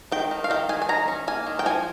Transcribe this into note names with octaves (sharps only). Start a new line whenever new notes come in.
D#3 G5
D#3
F5
D#3 G5
D#3 G#5
G#5
D#3 A#5
C#4
A#3 G#5
D#3
G5
F3 G#5